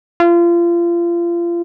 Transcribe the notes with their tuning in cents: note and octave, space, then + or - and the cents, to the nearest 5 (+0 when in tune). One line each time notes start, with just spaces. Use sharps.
F4 -30